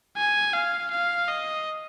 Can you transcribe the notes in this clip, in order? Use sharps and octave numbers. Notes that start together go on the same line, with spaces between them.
G#5
F5
F5
D#5